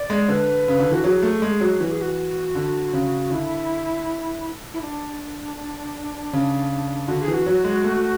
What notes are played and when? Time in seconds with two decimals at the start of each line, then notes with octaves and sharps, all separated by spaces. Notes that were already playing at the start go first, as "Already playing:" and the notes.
Already playing: D5
0.10 G#3
0.28 D3 B4
0.68 C#3
0.80 D3
0.91 E3 F#4
1.04 F#3 G#4
1.22 A3
1.42 G#3
1.61 F#3
1.80 E3 F#4
1.91 G#4
2.01 F#4
2.55 D3
2.93 C#3
3.30 D3 E4
4.74 E4
4.81 D4
6.33 C#3
7.08 D3 F#4
7.21 G#4
7.27 E3
7.34 F#4
7.46 F#3
7.64 G#3
7.84 A3